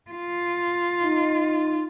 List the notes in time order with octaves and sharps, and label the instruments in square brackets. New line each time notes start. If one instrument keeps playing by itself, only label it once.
[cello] F4
[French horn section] D#4